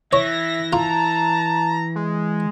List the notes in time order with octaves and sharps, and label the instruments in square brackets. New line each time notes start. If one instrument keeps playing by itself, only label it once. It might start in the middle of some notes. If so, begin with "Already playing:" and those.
[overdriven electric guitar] E3 [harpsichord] C#5 [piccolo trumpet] E5 [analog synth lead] A#6
[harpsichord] F4 [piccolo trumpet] A5 [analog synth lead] A#5
[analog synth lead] G#3